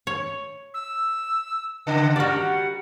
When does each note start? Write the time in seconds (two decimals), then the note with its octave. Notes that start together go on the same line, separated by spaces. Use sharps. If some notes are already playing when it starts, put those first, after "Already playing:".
0.07 C#5
0.74 E6
1.87 C#3 D#5
2.16 G3 F#4 A#4 D5 F#5